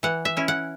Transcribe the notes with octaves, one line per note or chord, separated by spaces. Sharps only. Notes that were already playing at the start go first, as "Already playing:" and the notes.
E3 F#5
E5
C#4 E4
F#5